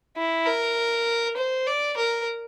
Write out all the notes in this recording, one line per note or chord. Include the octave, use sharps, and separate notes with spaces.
E4
A#4
C5
D5
A#4